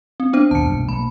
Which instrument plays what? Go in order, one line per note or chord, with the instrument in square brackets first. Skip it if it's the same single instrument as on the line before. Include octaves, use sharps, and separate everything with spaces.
[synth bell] C4
B3 D4 C5
[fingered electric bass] D#2 A#2 [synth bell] A5 C#7
[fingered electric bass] B1 G2 A#2
[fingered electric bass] B1 A#3 [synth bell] B5